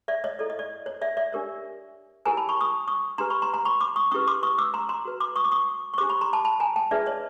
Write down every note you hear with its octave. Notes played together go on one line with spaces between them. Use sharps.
D5 E5
C#5 D#5
E4 A4 C#5 D5
D#5
D5
C#5
D5 E5
D5 E5
D4 G4 A#4 C#5
E4 G4 A#4 C#5 G#5 A#5
A5 B5
B5 C#6
C#6 D#6
C#6 D#6
D4 G4 B4 A#5 C6
B5 C#6
A#5 C6
A#5 C6
B5 C#6
C6 D6
C#6 D#6
C#4 E4 G4 B4 C#6 D#6
C6 D6
C#6 D#6
D6 E6
A#5 C6
A#5 C6
F#4 B4
C6 D6
C#6 D#6
D6
C#6 D#6
C#6
D4 G4 C5 C6 D6
B5 C#6
A#5 C6
A5 B5
A5 B5
G#5 A#5
G5 A5
D4 F4 G#4 B4 D5 E5
C#5 D#5